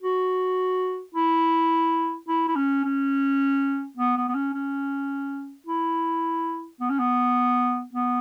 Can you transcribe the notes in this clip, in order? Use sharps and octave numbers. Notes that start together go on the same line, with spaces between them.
F#4
E4
E4
E4
C#4
C#4
B3
B3
B3
C#4
C#4
E4
B3
C#4
B3
B3